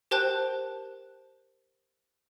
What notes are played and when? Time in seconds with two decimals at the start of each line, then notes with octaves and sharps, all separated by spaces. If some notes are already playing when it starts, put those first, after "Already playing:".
0.11 G4 A#4 C5 G5 A5 F#6